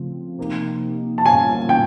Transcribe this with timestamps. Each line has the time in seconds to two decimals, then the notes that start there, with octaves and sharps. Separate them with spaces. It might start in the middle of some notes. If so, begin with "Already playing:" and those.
Already playing: C#3 F3 A3 C4 F4
0.38 C3 F3 A#3 D#4 G4
1.18 A5
1.25 A#2 G3 A#3 C#4 F4 G#5
1.69 G5